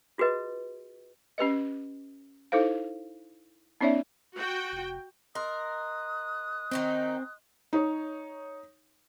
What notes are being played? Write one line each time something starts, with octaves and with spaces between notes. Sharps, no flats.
F4 F#4 G#4 B4 D#5
C#4 G4 B4 D#5
D#4 E4 A4 C5 F5
B3 C#4 D#4 C#5 D5 E5
F#4 G5
F1
A#4 D#5 C6 D#6 F#6
D#3 C4 C#4 D#4
D#4 C#5